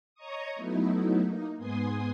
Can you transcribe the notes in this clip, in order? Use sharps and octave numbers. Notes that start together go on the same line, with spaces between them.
C#5 D#5 A#5 C#6 D#6
F#3 A3 B3 D#4 E4
A#3 D#4
G#2 B3 G#5 C6 D#6